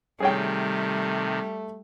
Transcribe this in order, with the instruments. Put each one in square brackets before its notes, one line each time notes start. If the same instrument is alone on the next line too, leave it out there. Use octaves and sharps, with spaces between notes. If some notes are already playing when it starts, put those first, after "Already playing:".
[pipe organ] C3 D#3 [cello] G3 [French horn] A3 [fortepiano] G#4 C#5 G5